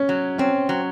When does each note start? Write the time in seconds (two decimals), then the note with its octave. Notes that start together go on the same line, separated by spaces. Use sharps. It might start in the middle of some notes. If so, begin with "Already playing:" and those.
Already playing: C#4
0.09 F#3
0.38 C4 C#4
0.69 F#3